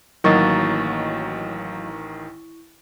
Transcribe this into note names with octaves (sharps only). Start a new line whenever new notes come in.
A1 D#3 F#3 A#3 D#4 E4 C#6 A6